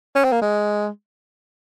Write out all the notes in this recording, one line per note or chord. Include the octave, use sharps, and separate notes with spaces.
C#4
C4
A#3
G#3